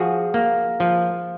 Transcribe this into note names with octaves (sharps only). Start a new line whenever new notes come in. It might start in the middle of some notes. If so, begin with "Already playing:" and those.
Already playing: F3 F#4 G#4
A#3
F3